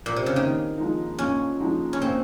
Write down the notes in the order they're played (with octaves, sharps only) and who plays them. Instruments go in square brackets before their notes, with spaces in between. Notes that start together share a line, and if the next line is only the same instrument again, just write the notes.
[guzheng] A#2
C3
C#3
[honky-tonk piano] A#2 [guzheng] D#3
[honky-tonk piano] F3 G#3 D#4
[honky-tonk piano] A#2 [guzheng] C#4
[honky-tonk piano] F3 G#3 D#4
[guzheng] C#4
[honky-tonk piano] A#2 [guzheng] C4